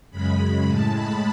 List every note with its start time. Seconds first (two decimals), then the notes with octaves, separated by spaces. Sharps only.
0.10 F#2 C#3 G#3 B5
0.67 A2 G#3 A5
0.94 B5